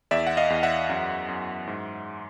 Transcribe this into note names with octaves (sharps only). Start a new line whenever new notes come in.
E2 D5 E5
F#5
D#5 F5
E2
E5 F#5
F#2
F#2
G#2